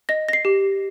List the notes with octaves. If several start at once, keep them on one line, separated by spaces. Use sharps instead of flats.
D#5 A#6
A#6
C7
G4